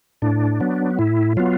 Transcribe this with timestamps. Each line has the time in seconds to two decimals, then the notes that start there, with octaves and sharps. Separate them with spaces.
0.22 A2 D4
0.60 F#3 B3
0.99 A2 E4
1.37 F#3 B3 F4